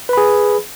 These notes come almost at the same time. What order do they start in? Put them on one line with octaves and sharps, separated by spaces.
B4 B5 G#4